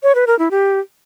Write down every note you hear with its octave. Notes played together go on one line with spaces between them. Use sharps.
C#5
B4
A#4
E4
G4